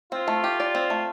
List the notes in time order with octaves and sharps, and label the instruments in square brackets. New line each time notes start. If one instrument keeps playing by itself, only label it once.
[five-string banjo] C4 [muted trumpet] F4
[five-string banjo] A3
G4
D5
C4
A3